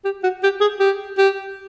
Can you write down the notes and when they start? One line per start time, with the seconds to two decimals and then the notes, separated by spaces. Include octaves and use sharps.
0.05 G4
0.23 F#4
0.43 G4
0.61 G#4
0.80 G4
1.18 G4